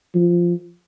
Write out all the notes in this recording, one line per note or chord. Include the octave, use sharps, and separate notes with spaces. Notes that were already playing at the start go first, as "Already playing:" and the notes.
F3